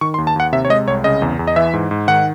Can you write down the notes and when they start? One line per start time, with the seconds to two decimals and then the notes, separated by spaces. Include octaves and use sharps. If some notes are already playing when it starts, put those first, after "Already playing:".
0.01 D#3 C#6
0.14 C6
0.18 D#2
0.27 A5
0.36 D#2 F#5
0.52 C3 E5
0.65 C#5
0.70 G#3 D#5
0.87 C2 C#5
1.04 C#3 D#5
1.22 E2
1.39 E2
1.47 D#5
1.56 E3 E5
1.73 G#2
1.91 G#2
2.08 D#3 F#5